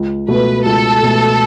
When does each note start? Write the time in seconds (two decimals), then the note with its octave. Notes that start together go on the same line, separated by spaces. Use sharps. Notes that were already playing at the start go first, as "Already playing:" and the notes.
Already playing: C#2
0.28 B2 A3 B4
0.65 C#2 A4
1.03 B2 A3